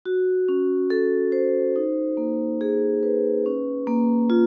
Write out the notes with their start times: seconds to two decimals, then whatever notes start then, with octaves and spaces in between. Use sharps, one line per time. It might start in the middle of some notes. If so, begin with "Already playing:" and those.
0.06 F#4
0.49 C#4
0.90 A4
1.32 C5
1.76 D#4
2.17 A#3
2.61 G#4
3.03 B4
3.46 C#4
3.87 A#3
4.30 F4